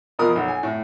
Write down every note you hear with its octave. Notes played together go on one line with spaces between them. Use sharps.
B2 F3 A#4 D#6
B1
G#5
A2